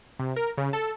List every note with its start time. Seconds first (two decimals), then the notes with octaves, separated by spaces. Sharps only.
0.19 C3
0.36 A#4
0.57 C#3
0.73 A4